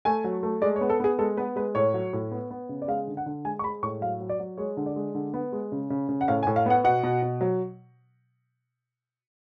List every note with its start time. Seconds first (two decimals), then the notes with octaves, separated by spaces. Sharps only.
0.05 A3 G#5
0.24 F#3
0.43 A3
0.62 G#3 D5
0.76 C#5
0.81 B3
0.90 A4
1.00 B3 G#4
1.19 G#3 A4
1.37 B3 B4
1.56 G#3 B4
1.75 A2 C#5
1.94 F#3
2.13 A2
2.31 B3
2.51 B3
2.69 C#3
2.82 D5
2.88 G#3 F5
3.07 D3
3.17 F#5
3.26 D3
3.45 G#3 G#5
3.59 C#6
3.63 G#3 B5
3.83 A2 C#6
4.01 F#3 F5
4.20 F#3
4.29 D5
4.40 F#3
4.57 G#3 C#5
4.77 D3
4.86 D5
4.96 G#3
5.15 D3
5.34 B3
5.52 G#3
5.72 C#3
5.90 C#3
6.09 C#3
6.21 F#5
6.28 A2 F5
6.43 G#5
6.47 A2
6.56 F5
6.66 B3 F#5
6.84 B2 F#5
7.03 B2
7.22 B2
7.41 F#3